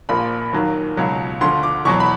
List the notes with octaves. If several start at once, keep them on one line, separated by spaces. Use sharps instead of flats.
A#1 A#2 F3 B5
D#2 D#3 F#3
C#2 B2 F#3
D2 D3 F3 C6
D6
E2 B2 F#3 C#6
B5